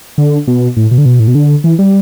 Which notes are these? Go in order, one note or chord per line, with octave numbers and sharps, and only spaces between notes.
D3
B2
A2
B2
D3
B2
A2
B2
D3
E3
G3